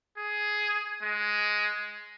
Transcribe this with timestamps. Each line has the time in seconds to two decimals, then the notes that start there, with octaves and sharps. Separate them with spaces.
0.18 G#4
1.03 G#3